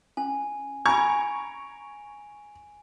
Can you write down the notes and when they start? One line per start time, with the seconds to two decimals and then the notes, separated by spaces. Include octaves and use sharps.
0.17 C#4 G#5
0.86 G#5 A#5 B5 C#6 G#6 D7 F7